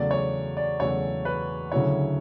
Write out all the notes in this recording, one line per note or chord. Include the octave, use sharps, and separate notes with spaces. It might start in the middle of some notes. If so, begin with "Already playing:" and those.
Already playing: E2 C#3 F#3 A3 D5
C#5
D5
E2 C#3 F#3 A3 C#5
B4
D2 C#3 F#3 A3 E4 C#5